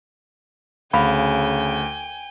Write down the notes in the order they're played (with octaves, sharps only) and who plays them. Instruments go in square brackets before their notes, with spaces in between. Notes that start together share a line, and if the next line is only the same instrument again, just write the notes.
[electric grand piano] D2 [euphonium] C#3 [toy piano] F5 B5 [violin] G5 G#5